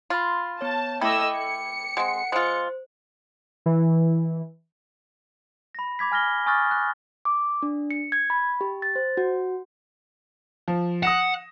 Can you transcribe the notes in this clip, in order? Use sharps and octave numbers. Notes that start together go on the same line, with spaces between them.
F4 B5 C6
B3 C#5 A5
A3 E4 D#5 G5 D6 E6
C#7
G#3 C4 F#5
G#3 F4 C5
E3
B5 A#6
B5 D6 G#6 B6
G#5 F6 A#6 G7
G#5 C#6 D#6 F6 F#6 A6
F#6
D6
D4
C#7
G#6
B5
G4
A6
C5
F#4
F3
F#5 D#6 A#6 E7